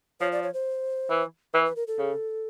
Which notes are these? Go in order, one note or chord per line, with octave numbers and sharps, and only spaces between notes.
F3 C#5
D5
C#5
C5
E3
E3 B4
B4
A#4
A4
C#3